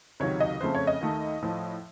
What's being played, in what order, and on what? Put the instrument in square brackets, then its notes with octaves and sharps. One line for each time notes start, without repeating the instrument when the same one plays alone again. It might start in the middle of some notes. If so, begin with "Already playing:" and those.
[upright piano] C#2 C3 D#3 F#3 C#5
D#5
F2 C#3 A3 C5
C#5
D#5
D#2 D#3 A3
A2 F3 A3